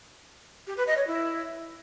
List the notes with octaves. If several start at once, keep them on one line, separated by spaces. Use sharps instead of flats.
G4
B4
D#5
C#5
E4